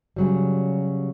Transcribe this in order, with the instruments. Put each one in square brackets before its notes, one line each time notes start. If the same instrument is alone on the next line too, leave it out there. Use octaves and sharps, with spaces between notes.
[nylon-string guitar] C#3 F#3 G3